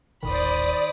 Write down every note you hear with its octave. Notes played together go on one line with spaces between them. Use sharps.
D#1 A1 D#3 C5 D5 B5 D#6